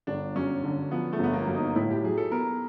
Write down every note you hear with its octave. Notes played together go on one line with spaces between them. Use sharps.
G1 D4
F#2 C#4
D3
F3 B3
A3
G1 B3
A#3
F#2
D#4
A2 E4
G4
F#3 G#4
A4
B3 A#4